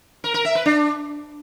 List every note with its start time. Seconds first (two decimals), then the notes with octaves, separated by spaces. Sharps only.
0.24 A#4
0.34 A#4
0.45 E5
0.55 B4
0.66 D4